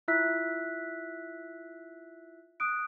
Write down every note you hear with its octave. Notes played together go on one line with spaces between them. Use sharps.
E4 F4 E5 E6 F#6 B6
D#6 F#6 D7